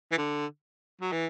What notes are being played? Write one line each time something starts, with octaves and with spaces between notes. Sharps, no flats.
E3
D3
F#3
E3